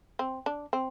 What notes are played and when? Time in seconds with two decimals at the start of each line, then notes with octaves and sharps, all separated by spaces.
0.19 C4
0.46 D4
0.73 C4